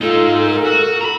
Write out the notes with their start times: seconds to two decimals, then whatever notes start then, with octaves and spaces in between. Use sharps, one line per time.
0.01 G#3 D#4 F4 A4
0.45 A#4
0.64 F#4
1.01 A#5 B5